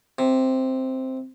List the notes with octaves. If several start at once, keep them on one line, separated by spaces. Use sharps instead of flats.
C3